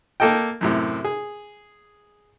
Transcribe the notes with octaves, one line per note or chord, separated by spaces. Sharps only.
A#3 A4 D#5 G5
F#2 A2 C3
G#4